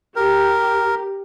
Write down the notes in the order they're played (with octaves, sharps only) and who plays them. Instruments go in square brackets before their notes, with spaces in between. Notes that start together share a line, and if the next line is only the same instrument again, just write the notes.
[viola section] G4 [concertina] A#4